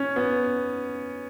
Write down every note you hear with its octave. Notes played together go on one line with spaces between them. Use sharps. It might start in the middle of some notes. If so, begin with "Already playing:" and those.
Already playing: C#4
B3